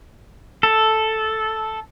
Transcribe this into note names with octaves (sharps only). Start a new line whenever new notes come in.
A4